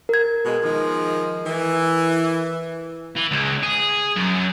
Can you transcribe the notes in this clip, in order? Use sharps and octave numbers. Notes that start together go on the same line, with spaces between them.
A#4 G#6
B2 G#3
D#3 F3 G#3
E3
E3
C#2
G#4
F#2